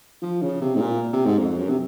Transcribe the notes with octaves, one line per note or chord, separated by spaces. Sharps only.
F3
C#3
C3
G#2
A#2
C3
G#2
F2
F#2
C3